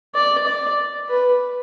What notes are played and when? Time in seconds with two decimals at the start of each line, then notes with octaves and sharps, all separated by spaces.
0.15 D5
0.47 D5
1.09 B4